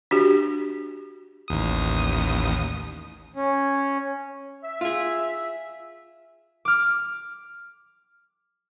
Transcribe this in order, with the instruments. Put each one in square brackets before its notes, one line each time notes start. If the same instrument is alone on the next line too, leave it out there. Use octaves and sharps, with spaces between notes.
[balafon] D4 F#4 G4
[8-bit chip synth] A1 D#2 D#6
[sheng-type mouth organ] C#4
[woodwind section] E5
[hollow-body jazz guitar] F4 G#4
[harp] D6 F6